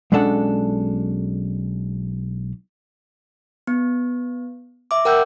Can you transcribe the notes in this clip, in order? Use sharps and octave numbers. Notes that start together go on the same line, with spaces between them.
B1 G#3 C#4 D4 A4 F#5
B3
E5 D6
A#4 F#5 G5 E6 F#6 G6